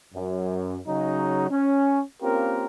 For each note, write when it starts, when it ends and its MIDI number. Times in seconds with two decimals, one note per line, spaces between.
0.14 0.78 42
0.87 1.46 49
0.87 1.46 54
0.87 1.46 63
1.50 2.01 61
2.22 2.67 58
2.22 2.67 60
2.22 2.67 61
2.22 2.67 65
2.22 2.67 67
2.22 2.67 70